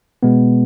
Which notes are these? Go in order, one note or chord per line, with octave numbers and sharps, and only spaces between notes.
B2 G#3 B3